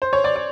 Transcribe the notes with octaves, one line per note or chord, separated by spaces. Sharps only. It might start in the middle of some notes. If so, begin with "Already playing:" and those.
C5
C#5
D5
D5